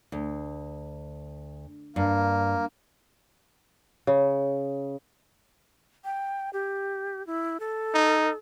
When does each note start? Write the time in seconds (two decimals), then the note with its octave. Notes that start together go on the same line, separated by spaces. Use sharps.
0.12 D2
1.96 G2 A#3
4.07 C#3
6.04 G5
6.53 G4
7.27 E4
7.60 A4
7.94 D#4